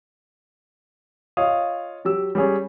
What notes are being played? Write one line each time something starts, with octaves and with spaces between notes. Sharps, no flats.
F4 C#5 D#5 F5 D#6
F#3 G4 E6
G3 C#4 G#4 C#5